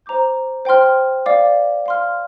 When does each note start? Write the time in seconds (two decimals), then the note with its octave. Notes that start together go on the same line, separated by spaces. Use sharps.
0.06 C5 A#5 D6 G6
0.65 C5 G5 C6 F6
1.26 D5 F5 D6
1.86 F5 C6 F6